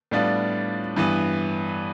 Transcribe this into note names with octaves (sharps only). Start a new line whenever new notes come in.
A2 G3 B3 D4 F4
G2 E3 B3